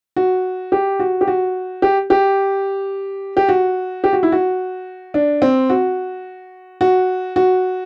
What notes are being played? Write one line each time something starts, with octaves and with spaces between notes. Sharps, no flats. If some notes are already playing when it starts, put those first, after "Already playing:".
F#4
G4
F#4
G4
F#4
G4
G4
G4
F#4
G4
F#4
E4
F#4
D4
C4
F#4
F#4
F#4